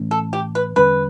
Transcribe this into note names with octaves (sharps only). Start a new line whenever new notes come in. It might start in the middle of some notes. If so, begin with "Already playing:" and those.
Already playing: A2 E3 A3 C#4
A4
G4
B4
E2 D3 G3 C#4 B4